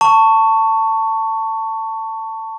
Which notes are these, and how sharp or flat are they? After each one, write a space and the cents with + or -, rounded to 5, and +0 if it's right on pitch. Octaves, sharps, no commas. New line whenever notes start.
A5 +20 C#6 +5